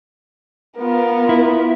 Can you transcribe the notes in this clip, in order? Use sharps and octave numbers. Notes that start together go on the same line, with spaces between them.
B3 F4 A#4
E4